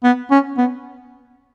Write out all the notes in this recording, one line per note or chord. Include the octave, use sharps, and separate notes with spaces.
B3
C#4
B3